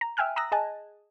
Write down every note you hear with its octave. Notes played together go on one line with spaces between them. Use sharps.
A#5
E5 G5 G#5 F6 F#6
A#5 D#6 E6 F#6 A#6
G#4 D#5 G#5 A5 F#6